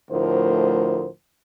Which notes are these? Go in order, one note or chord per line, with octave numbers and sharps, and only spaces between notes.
D2 A2 F3 A#4 C5